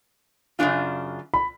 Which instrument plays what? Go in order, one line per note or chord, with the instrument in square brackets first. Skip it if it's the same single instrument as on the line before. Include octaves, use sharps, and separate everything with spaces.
[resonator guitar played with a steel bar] F#2 C#3 G#3 D4 F4
[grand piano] B5